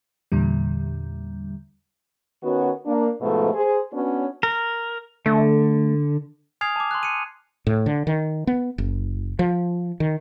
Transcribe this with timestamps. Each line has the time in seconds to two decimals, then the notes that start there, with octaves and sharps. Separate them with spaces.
0.32 E2 A#2 D3 G3
2.43 D#3 B3 C#4 F#4
2.86 A#3 D4
3.21 G#2 B2 F3 A3
3.54 G#4 C5
3.93 B3 C#4 D4 F#4 B4 C#5
4.43 A#4
5.26 D3 A3
6.61 G#5 D#6 F6 G#6 C7 F7
6.76 A5 D6
6.91 C6 F#6
7.03 C#7 D#7
7.67 A2
7.86 D3
8.07 D#3
8.47 B3
8.78 F#1
9.39 F3
10.00 D#3